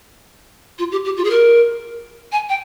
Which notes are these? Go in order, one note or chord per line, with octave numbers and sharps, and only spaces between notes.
F4
G4
G4
F4
G#4
A#4
G#5
G5